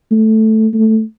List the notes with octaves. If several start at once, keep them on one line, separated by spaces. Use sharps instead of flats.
A3
A3